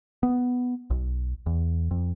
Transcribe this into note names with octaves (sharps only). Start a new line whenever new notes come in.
B3
B1
E2
F2